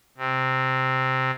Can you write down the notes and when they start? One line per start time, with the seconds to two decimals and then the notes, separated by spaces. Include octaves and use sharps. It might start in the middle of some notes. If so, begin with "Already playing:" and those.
0.18 C3